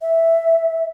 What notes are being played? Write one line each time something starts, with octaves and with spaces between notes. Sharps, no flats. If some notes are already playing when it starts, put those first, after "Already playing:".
E5